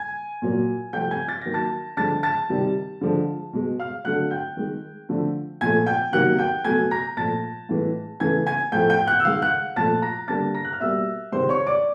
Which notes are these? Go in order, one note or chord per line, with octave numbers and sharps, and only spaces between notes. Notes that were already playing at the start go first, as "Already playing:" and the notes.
Already playing: G#5 G#6
A#2 F#3 A#3
C3 F3 A3 G5 G6
G#5 G#6
A6
D#3 F#3 A#3 A#6
A5 A6
D3 F3 G#3 A5 A6
A5 A6
C3 D#3 G3
D3 F3 G#3
B2 G#3
F5 F6
D3 F#3 A3 F#5 F#6
G5 G6
D#3 G#3
D3 F3 A3
A#2 F3 A3 G#5 G#6
G5 G6
C3 D#3 F#3 A#3 F#5 F#6
G5 G6
B2 F#3 A3 G#5 G#6
A#5 A#6
A#2 F3 A3 A5 A6
A2 E3 G#3
C#3 E3 A3 G#5 G#6
G#5 G#6
A2 F3 A3 G5 G6
G5 G6
F#5 F#6
E6
D#3 G#3 F5 F6
F#5 F#6
A#2 F3 A3 A5 A6
A#5 A#6
D3 G3 A#3 A5 A6
A#5 A#6
F#6
F6
B2 G3 A#3 E5 E6
C3 D#3 G#3 C5 C6
C#5 C#6
D5 D6